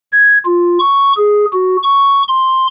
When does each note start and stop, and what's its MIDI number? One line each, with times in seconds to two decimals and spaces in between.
0.12 0.39 92
0.45 0.78 65
0.79 1.12 85
1.17 1.45 68
1.52 1.76 66
1.83 2.22 85
2.28 2.67 84